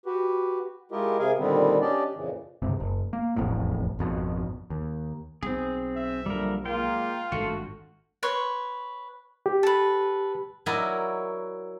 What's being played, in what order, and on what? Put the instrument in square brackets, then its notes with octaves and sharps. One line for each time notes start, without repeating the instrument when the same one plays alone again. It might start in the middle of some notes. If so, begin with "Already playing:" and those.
[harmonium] F#4 G4 B4
G#3 E4 F4 G4 A#4 D#5
C3 G#4 A#4 F5 G#5
A#2 D3 D#3 G3 B3 C4
C#4 D4 G4 D5 D#5
F2 A#2 C#3 E3
[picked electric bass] G1 C#2 C3
F#1
A#3
E1 A1 F2 A2
G#1 F2 B2
D#2
[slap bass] B1 [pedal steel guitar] C4 G#4
[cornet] E5
[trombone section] A#2 D3 F3 [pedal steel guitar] G3 A#4
[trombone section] A#2 G#3 A#3 [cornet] F4 [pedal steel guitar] G5
[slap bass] G#1 G2 [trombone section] A3 [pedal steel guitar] F#4
[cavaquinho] B4 C#5 C6
[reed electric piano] G4
[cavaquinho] A4 B4
[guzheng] F#3 E4 F#4 A#4 D5 D#5